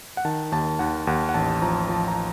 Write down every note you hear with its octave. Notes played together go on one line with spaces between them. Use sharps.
F#5
D#3 A5
D#2 A5
D#2 F#5
D#2 F#5
F#5
A1 A5
A5
F3 A#5
F3 A5
A#5